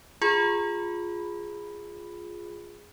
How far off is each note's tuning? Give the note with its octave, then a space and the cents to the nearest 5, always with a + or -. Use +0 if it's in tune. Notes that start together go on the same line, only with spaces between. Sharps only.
F4 +5 G#4 -5 B5 +0